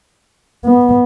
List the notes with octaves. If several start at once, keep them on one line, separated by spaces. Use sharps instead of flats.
B3